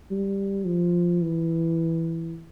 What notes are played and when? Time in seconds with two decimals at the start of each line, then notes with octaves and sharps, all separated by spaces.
0.11 G3
0.66 F3
1.22 E3